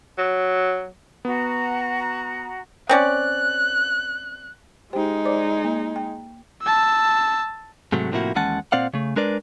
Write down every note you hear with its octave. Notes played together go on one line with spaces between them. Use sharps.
F#3
B3 F#4 A#5
C4 C#4 D5 F#6
G#3 D#4 G4 C5 G5
C5 D5 D6
A#3
G5
A5 E6
G#2 C3 F#3 A3
A2 C3 F3 A#3 E4 F#4
D#2 E3 G#3 C#4 F#5 A5
A#2 C4 D5 F5 F#5
C#3 A3
G#3 D4 A#4 B4 D5